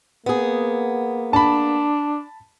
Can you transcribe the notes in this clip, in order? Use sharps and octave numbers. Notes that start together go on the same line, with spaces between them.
A#3 B3 G#4
D4 A5 B5